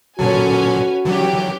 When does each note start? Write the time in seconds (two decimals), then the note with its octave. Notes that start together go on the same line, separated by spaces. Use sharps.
0.19 A#2 D3 F#3 C#4 F#4 A4 B4 G#5
1.05 D3 E3 F#3 C#4 G4